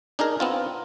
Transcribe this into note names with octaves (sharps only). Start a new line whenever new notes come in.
D4 D#4 G#4 A#4
B3 C4 F4